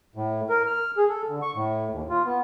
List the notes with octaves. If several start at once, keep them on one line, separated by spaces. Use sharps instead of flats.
A2
A#4
F6
G#4
A4
D3
C#6
A2
D#2
F4
B3